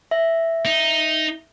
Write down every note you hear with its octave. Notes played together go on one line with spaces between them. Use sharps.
E5
D#4